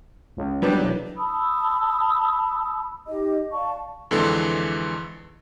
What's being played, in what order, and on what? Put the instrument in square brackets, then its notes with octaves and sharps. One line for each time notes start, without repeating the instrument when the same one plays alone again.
[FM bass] C#2
[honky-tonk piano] F#3 B3 D4 [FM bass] G3
[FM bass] E1
[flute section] A5 B5 D#6 E6
D#4 G4 D#5
D5 F5 A5 C#6
[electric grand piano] F2 D3 E3 G#3 A4 C6